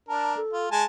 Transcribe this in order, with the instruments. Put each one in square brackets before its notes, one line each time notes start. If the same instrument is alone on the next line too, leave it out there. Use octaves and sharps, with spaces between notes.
[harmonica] D4 A#4 [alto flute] A5
[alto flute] A4
[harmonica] F4
G#3 G#5 A5